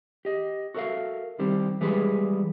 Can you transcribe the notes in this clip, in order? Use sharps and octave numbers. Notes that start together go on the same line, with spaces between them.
G4 D#5
F#4 A4 A#4 D5 E5 F5
C2 C3 D#3 G3 C4
E3 G3 G#3 G#4 B4